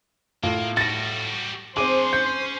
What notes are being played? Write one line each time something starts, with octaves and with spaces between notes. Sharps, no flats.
A2 A#3 F4
G3 F#4 A6 A#6
C4 D4 G#4 C5 G#5 D6
C#4 G6